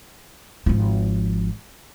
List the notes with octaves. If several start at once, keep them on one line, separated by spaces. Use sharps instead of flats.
G#1 F3